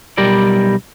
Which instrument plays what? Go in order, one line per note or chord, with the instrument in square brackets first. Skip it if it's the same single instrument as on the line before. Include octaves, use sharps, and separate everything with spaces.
[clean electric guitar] B1 G3 G4 A#4 D5